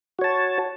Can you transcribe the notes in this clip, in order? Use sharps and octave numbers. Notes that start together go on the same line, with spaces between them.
F#4 C#5 A5